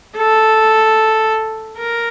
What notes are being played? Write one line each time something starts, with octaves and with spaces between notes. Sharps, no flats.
A4
A#4